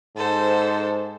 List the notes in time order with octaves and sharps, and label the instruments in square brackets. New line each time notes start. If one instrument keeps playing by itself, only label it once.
[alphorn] G#2 [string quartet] A4 C5